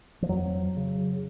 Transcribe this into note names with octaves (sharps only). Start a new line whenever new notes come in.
F3
F2 F#3
C#3